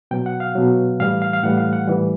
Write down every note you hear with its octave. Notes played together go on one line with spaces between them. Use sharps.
B2 F#3 G5
F#5
F5
B2 F#3
A2 E3 G3 F5
F5
F5
A2 E3 G3 F#5
F5
F#5
A2 E3 G3